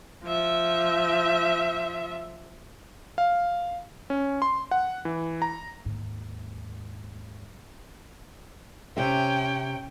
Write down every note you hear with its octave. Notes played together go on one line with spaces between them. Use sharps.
F3 E5
F5
C#4
C6
F#5
E3
A#5
D#2 G#2
C3 C#4 G4 E5 G5